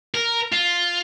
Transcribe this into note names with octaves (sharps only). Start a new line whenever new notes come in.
A#4
F4